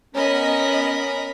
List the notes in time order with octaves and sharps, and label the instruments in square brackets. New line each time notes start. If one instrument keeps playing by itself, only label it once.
[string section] B3 D#5 [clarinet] C#4 [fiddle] A#4 B5 [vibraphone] C#5